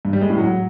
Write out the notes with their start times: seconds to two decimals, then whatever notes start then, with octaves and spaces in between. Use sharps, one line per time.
0.05 G2
0.13 G3
0.21 G#3
0.30 A2
0.38 F#3